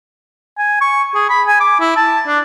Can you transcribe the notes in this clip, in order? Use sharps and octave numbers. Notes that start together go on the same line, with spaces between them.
G#5
C#6
G#4
B5
G#5
D6
E4
A5
D4